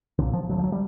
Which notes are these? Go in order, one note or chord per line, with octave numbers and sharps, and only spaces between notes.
B1 A#2 D3
F3
E1 D2 D3 F#3
F3
F#3
G3